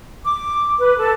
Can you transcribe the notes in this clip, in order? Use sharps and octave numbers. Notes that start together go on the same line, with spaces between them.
D6
B4
A4